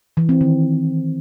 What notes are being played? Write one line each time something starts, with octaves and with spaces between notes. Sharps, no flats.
E3
C4
D#3